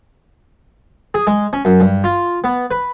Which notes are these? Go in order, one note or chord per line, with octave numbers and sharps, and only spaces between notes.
G#4
G#3
C#4
F#2
G2
F4
B3
B4